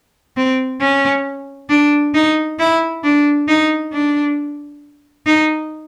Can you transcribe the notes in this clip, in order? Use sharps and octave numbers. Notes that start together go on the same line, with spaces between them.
C4
C#4
D4
D#4
E4
D4
D#4
D4
D#4